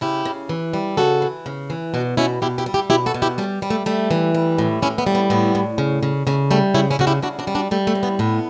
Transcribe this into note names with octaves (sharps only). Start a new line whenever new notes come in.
C#3 E4 G4
C#3
E3
G3
C#3 F#4 A4
E3
C#3
E3
B2 D4 F#4
B2 C#4 E4
B2 E4 G4
E4 G4
G3
E4 G4
B2 E4 G4
F#4 A4
B2
E4 G4
G3 A3 C#4
G3
A3
G3 A3
E3
G3
A2
A2 C#4 E4
B3
G3
B3
A2 B3
A2
C#3
C#3
C#3 A3
G3 A3
C#3 C#4 E4
C#4 E4
C#3 F#4
E4 G4
C#3 D4 F#4
D4 F#4
G3
D4 F#4
G3 A3
A3
A2
B3
A2 B3